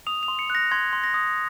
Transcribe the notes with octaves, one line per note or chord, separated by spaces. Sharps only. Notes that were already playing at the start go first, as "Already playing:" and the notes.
D#6 F7
F7
C6
C#7
F#6 A#6
C6 G#6
C6
A#6
D#6